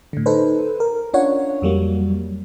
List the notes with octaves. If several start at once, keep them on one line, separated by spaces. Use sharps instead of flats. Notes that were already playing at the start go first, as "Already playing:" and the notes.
A2 D3
D#4 A4 B4 C5
A#4
C#4 D4 F4 C#5 F#5
F2 F#3 G3 A#3